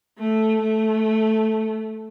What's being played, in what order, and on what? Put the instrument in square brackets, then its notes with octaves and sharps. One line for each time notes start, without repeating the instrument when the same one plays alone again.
[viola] A3
A3